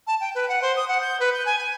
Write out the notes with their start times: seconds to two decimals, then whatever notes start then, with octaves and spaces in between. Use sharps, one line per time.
0.07 A5
0.20 G5
0.35 B4
0.49 F#5
0.62 C5
0.76 D#6
0.88 F#5
1.01 G6
1.20 B4
1.34 G6
1.46 G#5
1.58 G#5